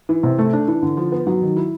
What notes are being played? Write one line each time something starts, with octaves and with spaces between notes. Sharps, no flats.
E3
C3
A3
D4
E3
D3
F3
B3
F#3
D#3
E4